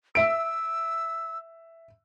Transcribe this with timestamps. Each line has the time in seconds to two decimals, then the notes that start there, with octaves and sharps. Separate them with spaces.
0.15 E5 E6 D7